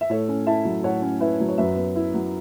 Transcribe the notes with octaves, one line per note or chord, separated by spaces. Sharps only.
E5
A2 A4 C#5
C#4
E4 E5 A5
F#3
A2 C#5 F#5
C#4
E4 B4 E5
F#3
C#5
F#2 B4 E5
B3
E4
F#3